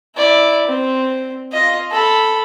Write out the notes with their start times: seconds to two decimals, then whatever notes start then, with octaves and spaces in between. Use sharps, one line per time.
0.16 E4 D5
0.67 C4
1.53 F4 D#5
1.92 A4 B5